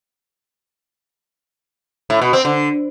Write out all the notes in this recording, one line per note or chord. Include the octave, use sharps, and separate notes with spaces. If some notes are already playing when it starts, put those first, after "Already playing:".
A2
B2
C4
D3